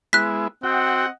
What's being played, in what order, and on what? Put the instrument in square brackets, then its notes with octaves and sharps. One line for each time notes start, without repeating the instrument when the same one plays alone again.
[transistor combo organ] G#3 B3 E4 [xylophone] F#6 B6
[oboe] C4 [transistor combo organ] F#4 G5 [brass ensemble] D#5 F#5